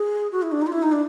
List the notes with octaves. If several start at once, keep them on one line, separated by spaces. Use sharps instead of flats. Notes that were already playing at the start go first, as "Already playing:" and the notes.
Already playing: G#4
F#4
E4
D4
D#4
F4
E4
D#4
D4